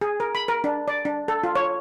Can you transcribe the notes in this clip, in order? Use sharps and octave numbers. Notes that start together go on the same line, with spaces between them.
G#4
A#4
B5
A#4
D4
D5
D4
A4
F4
C#5